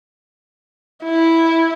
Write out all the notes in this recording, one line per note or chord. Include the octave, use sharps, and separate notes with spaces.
E4